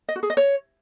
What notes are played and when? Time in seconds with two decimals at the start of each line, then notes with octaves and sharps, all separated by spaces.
0.09 D#5
0.16 F#4
0.23 G#4
0.30 D#5
0.37 C#5